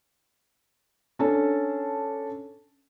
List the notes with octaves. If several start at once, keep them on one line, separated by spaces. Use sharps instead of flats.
C#4 D4 A4 A5